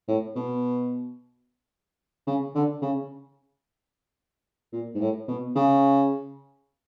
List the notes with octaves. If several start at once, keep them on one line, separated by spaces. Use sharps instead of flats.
A2
B2
C#3
D3
C#3
A#2
G#2
A2
B2
C#3